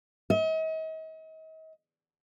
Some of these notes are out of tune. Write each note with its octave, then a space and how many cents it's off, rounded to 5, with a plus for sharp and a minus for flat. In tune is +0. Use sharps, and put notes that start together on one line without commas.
D#5 +40